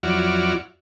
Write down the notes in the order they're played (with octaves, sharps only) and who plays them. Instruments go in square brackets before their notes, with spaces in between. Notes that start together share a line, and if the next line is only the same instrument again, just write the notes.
[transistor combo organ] F2 F#3 E4 F#4 D5 F6